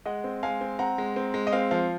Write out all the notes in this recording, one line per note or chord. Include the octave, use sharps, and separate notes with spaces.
G#3 D#5 F#5
C4
G#3 F5 G#5
C4
C4 F#5 A#5
G#3
C4
G#3
D#5
C4 F5
F3 F5